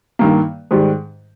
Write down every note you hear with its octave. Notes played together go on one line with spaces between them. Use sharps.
G2 D#3 A#3
G#2 D#3 G3